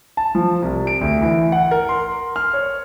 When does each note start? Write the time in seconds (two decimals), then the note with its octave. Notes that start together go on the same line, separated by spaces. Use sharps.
0.17 A5
0.35 F3
0.62 C2
0.87 D7
1.01 D2
1.22 E3
1.52 F#5
1.71 A#4
1.89 C6
2.36 F6
2.53 C#5